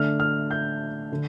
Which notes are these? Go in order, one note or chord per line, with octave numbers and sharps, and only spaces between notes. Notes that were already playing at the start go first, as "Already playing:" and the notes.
Already playing: D3 A3 D4 F6
F6
G6
D3